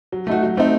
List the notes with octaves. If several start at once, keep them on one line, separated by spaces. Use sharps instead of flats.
F#3
A3 D#4 F#4
F#3
A3 C4 D#4